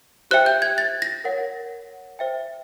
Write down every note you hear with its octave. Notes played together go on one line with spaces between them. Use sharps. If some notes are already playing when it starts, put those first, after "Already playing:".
G4 C5 E5 G5 F#6
G6
G#6
A6
A#6
A#4 C#5 F#5
C5 E5 G5